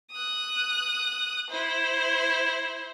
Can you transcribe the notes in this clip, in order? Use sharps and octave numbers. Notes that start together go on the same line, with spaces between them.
D#6 F#6
E4 C5